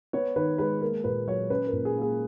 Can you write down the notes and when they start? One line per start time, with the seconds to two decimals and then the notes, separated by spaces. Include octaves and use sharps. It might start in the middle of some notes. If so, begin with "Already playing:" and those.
0.13 B3 C#5
0.36 D#3 B4
0.58 G#3 B4
0.81 A#3 A#4
1.04 A#2 B4
1.27 F#3 C#5
1.50 C#4 B4
1.67 A#4
1.73 A#2
1.85 G#4
1.97 A#3 G#4